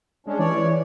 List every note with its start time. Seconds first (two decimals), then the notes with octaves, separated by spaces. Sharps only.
0.27 G#3 C#4 D4
0.39 E3 C#5 D5